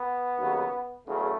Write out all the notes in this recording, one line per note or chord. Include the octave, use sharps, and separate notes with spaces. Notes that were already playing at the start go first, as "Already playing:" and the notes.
Already playing: B3
D#2 C#3 F#3
E2 C#3 F#3 A3